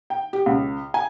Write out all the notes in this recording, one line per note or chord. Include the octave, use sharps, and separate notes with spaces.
G5
G4
C#2
G#5